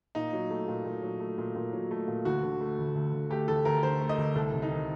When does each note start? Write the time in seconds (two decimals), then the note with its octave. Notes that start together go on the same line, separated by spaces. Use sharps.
0.15 A#2 D#4
0.33 F#3
0.50 A3
0.68 A#2
0.85 A#2
1.02 F#3
1.20 A3
1.38 A#2
1.55 A#2
1.73 F#3
1.91 A3
2.08 A#2
2.25 D2 F#4
2.43 D3
2.61 A3
2.78 D2
2.95 D2
3.13 D3
3.30 A3 G4
3.48 D2 A4
3.65 D2 A#4
3.83 D3 C5
4.00 A3
4.09 D#5
4.18 D2
4.35 C2 A4
4.53 C3
4.62 D#4
4.71 D#3